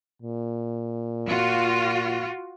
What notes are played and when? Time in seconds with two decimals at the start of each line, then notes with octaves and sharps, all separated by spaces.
0.22 A#2
1.29 F4 F#4